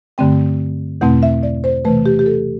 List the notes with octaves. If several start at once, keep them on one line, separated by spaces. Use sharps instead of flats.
G2 D3 A3 C4 G5
E2 B2 A3 C4 F#5
E5
D5
C5
C3 E3 A3 B4
G4
G4
A4